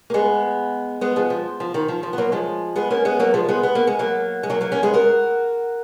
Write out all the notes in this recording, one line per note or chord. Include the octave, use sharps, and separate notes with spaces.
A#3
G#3 B3
G#3 B3
F3 G#3
F3
F3
D#3
F3
F3
B3
F#3 A#3
F3 G#3
G#3 B3
A#3 C#4
G#3 B3
F#3 A#3
F3 G#3
G#3 B3
B3
A#3
G#3
F#3 A#3
G#3
F#3 A#3
F#3 A#3
A#3 C#4
G#3 B3
F#4 A#4